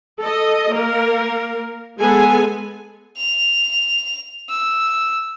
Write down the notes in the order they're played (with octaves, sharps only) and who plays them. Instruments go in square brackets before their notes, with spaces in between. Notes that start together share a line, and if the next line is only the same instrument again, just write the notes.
[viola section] A4 D#5
A#3 A#4
G#3 B3 G#4 A4 G#5
[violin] F7
E6